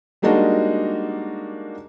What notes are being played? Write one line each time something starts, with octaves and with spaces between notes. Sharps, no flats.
G3 G#3 A#3 D4 D#4 F#4